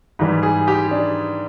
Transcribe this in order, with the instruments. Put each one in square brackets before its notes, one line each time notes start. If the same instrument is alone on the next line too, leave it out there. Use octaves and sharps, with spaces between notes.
[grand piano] G#2 E3 G3
G#4
G4
D4